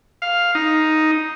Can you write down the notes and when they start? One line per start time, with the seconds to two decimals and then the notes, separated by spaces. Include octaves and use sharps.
0.22 F5
0.55 D#4